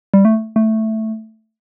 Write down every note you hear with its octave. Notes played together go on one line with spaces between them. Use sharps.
G3
A3
A3